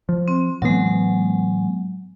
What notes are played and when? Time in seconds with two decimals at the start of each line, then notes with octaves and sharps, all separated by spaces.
0.09 F3
0.28 C4
0.62 A2 E3 F#3 G#3 B3